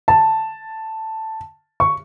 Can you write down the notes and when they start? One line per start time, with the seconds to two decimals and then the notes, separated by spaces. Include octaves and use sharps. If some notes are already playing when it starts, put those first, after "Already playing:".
0.08 A5
1.80 C#6